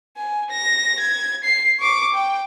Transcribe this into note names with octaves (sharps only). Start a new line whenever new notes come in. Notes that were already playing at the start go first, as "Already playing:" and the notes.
G#5
A#6
G#6
C7
C#6 D6
G5